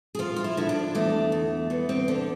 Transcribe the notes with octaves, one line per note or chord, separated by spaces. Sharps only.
G#4
F3 F4
F4
E4
D3 E4
D4
E2 A3
E2
E2 B3
C4
D3 D4